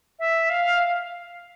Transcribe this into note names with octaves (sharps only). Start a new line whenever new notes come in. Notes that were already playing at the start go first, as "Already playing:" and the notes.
E5
F5